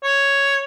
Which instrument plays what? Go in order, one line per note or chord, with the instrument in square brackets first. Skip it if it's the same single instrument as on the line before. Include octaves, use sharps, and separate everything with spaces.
[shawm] C#5